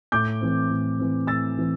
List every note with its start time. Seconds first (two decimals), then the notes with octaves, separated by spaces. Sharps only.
0.12 A2 D6 G6
0.41 E3 C4
0.70 A2
0.99 E3 C4
1.27 A2 E6 A6
1.57 E3 C4